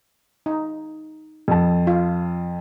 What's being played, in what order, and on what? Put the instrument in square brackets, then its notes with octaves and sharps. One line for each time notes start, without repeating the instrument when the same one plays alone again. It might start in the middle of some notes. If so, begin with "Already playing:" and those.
[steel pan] D#4
[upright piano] F2 A5
[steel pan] F4